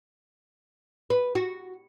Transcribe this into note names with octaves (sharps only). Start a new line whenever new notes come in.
B4
F#4